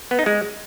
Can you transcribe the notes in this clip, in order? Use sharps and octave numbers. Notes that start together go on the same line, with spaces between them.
B3
D#4
G#3